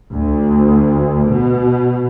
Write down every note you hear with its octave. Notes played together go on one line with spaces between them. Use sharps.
D2
B2